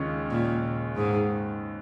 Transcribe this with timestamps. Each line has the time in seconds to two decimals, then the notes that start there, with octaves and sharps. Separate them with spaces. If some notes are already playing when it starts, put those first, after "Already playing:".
Already playing: D#2 C#3 G#3 C#4 F4
0.30 A#2
0.96 G#2